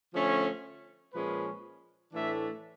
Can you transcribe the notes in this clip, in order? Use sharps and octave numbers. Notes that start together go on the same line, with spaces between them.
D3 F3 A3 C#4
A#2 F3 G#3 C#4 B4
A2 E3 A3 D4 E5